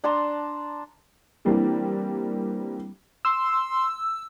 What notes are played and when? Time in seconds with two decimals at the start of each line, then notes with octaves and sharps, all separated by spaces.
0.04 D4 A5 A#5 C6
1.45 E3 G3 A#3 C4 D4
3.25 C6 E6